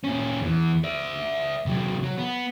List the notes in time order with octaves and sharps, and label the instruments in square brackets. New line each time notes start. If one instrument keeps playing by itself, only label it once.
[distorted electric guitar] A#2 C#4
E2 E3
D5 E5
C3 F#3
F#3
B3